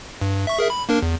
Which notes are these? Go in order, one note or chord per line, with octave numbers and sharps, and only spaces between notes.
G2
E5 C#6
G#4 A#4 E5
B5
A#3 D4 A#4
E2